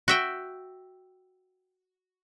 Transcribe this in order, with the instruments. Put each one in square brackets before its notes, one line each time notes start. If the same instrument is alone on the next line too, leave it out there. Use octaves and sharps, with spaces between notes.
[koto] F#4 E5 G5